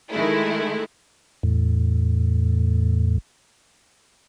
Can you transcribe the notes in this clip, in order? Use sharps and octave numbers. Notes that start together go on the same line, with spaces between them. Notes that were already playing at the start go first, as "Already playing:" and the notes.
D#3 G#3 A3 E4
E2 A2